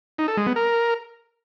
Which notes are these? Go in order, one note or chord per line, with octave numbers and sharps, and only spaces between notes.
D#4
A4
G#3
B3
A#4